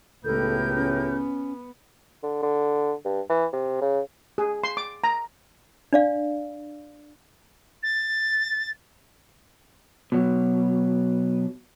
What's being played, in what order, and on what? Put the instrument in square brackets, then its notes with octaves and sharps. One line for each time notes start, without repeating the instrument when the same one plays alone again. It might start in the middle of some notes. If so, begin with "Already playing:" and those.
[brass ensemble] C#2 A2 [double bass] B3 [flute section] G4 A#4 G6 [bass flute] A4
[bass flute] C#4
[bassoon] D3
D3
G2
E3
C3
C#3
[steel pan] G#4
C6
D6
A#5
[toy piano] D4 D5 F5
[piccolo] A6
[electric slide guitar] B2 F#3